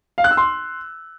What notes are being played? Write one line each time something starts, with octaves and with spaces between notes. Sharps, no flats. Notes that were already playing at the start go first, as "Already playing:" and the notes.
F5
F#6
E6
C6